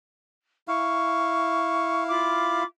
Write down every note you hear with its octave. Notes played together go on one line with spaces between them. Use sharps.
E4 F5 C#6
F4 B5 D6